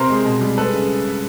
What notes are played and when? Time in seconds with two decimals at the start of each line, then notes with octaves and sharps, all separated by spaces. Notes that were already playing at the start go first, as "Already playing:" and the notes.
Already playing: C3 A#4 C5
0.09 G#3
0.25 B2
0.41 G3
0.58 G#3 A4 B4
0.73 C#3